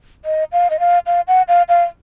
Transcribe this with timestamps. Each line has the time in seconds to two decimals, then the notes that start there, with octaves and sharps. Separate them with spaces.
0.25 D#5
0.52 F5
0.70 D#5
0.80 F5
1.06 F5
1.28 F#5
1.48 F5
1.69 F5